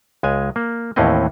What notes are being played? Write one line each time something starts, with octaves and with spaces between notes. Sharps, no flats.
C#2 G#3 G#5
A#3
D#2 A2 E3 C4 C#4 D#5